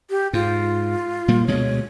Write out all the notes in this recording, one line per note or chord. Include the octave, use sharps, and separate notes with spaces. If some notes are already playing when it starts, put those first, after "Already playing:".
G4
G#2 F4
A#2 G3 A#3
D2 B2 G#3 C#5